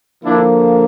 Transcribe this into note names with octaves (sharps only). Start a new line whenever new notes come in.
D3 F3 A#3 D4 E4